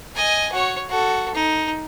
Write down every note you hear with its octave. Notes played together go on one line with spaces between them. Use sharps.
D#5 G#5
F#4 C#5
F#4 A4
D#4